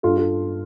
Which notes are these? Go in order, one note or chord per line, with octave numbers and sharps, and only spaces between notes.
G2 F4 A4
F4 A4